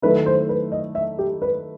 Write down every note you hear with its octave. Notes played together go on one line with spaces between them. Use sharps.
D#3 F#3 A3 E4 B4
C5
B4
D#5
E5
G4
B4